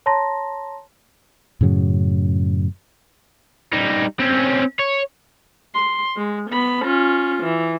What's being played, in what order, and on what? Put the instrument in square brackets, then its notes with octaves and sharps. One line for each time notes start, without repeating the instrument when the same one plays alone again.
[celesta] C#5 A5 A#5 C6 A#6
[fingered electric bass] F#2 A2 C#3 F#3
[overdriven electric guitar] G3 D#4
C4 C#4
C#5
[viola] C6
G#3
B3 B5
C#4 F4
E3